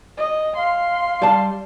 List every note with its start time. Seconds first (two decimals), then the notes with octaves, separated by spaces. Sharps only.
0.17 D#5
0.56 F5 C6
1.22 G3 A5